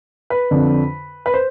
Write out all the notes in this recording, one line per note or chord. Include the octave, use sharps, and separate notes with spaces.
B4
F2 D3
B4
C5